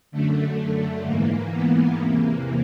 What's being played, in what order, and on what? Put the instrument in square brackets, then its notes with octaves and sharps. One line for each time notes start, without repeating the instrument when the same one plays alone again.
[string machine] F#2 D3 A3
G#2 E3 A#3
B3
E2 C3 E3 A#3